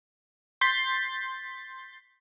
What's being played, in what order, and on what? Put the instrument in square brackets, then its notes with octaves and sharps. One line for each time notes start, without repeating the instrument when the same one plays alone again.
[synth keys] C6 G6 A6 B6